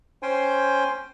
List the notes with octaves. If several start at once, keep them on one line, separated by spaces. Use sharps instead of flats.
C#4 C5 G5 G#5 C6